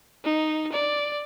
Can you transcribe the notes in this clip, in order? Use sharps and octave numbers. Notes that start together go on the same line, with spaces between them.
D#4
D5